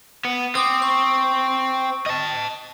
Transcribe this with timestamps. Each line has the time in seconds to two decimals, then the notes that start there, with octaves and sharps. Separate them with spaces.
0.25 B3
0.55 C4 D6 D#6
0.82 C#6
2.06 D#5 A5